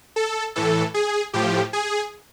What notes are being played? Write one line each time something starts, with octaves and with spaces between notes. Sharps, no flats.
A4
A2 E3 A4
G#4
A2 F3 G4
G#4